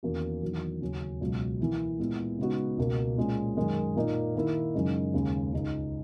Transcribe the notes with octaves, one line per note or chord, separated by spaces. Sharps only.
E2 D#3 A#3 C#4 F#4
E2 D#3 F#3
D#2 C#3 F#3 C#4
C#2 B2 F#3
E3 A#3 E4
A#2 G#3 B3 E4
C#3 G#3 B3 D#4 F#4
C#2 B2 A#3
A#2 G#3 C#4
F#2 D#3 G#3
A#2 A#3 D#4 A#4
D#3 A#3 E4
F#2 C#3 G#3 D#4
D#2 C#3 G#3
C#2 C#3 G#3 D#4